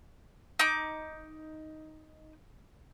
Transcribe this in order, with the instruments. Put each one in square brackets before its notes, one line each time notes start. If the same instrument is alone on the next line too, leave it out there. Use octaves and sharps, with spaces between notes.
[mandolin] D#4 D6